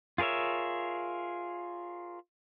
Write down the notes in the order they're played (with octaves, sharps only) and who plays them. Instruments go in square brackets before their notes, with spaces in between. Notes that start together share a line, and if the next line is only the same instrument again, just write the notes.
[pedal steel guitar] F4 G#4 A#4 C#5 E5